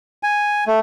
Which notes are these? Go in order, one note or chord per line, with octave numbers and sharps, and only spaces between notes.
G#5
A3